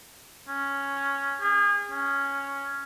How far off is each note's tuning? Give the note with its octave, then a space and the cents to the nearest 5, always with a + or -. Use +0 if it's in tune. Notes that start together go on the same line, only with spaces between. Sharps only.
C#4 +0
G#4 -35
C#4 +0